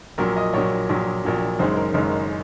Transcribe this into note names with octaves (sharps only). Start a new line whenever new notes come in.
A#1 A#2 F#3 A#4
D#5
A#1 A#2 F#3 C#5
A#1 A#2 F#3
A#1 A#2 F#3
F#1 F#2 D#3 G#3 C5
A#4
F#1 F#2 D#3 G#3 A#4